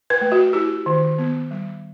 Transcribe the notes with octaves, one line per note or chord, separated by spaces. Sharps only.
B4
A3
F#4
E4 G4
D#3
B3
G3